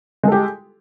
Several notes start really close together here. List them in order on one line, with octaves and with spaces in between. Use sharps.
G#3 A4 G4